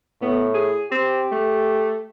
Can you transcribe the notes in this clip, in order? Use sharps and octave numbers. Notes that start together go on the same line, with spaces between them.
A2 B3
G#4
C4 G4
A3